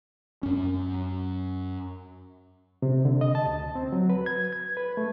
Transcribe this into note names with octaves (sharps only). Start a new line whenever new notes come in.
F#2 C#4
C3
D3
D#5
A5
D2
C4
F#3
B4
G#6
G#6
B4
A3